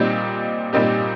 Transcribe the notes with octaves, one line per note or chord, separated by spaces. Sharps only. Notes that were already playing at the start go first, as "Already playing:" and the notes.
Already playing: A#2 G3 C4 D#4 G4
A#2 G3 C4 D#4 G4